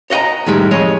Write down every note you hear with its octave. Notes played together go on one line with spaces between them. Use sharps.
C#5 D#5 F#5 G#5 A#5
A2 D#3 G3 G#3
F2 G#3 C#5 D#5